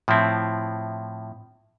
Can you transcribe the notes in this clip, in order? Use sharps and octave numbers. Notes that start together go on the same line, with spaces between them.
A2 F3 C4 E4